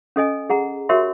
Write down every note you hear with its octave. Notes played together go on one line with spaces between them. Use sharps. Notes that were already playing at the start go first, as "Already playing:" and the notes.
C#4 A4 D#5 G#5
G#4 F#5 A#5
F#4 G4 A#4 C#5 E5 C6